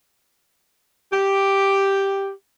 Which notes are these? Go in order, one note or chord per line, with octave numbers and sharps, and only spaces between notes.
G4